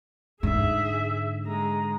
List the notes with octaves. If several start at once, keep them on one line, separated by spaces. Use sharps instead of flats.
G#2 D3 G#4 E5
G#3 A#5